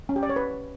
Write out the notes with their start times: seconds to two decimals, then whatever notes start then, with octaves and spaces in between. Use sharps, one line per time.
0.09 C#4
0.16 G4
0.23 D5
0.29 C#5
0.36 B4